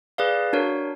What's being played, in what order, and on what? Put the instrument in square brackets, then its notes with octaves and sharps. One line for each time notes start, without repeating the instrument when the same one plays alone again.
[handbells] G#4 B4 D5 F5
D4 F#4 A#4 C#5